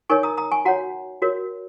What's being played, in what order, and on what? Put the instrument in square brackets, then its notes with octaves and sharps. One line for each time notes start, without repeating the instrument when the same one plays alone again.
[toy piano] D#4 A#4 C#5 G#5 C#6
A#5 D#6
A#5 D#6
G#5 C#6
F#4 C#5 F#5 A#5
F#4 A#4 C#5